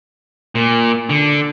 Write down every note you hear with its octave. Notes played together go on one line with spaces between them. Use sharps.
A#2
D3